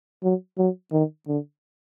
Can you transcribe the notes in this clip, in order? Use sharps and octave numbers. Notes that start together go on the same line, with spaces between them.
F#3
F#3
D#3
D3